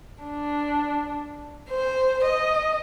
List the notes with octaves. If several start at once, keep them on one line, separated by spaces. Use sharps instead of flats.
D4
C5
D#5